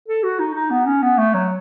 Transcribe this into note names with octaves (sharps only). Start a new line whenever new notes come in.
A4
F#4
D#4
D#4
B3
C#4
B3
A3
F#3